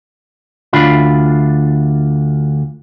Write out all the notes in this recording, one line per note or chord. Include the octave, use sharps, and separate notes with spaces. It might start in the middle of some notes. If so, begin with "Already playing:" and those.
D2 D4 F4 B5